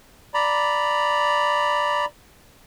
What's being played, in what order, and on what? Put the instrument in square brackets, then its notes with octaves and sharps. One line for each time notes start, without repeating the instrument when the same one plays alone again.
[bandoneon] D5 A#5 B5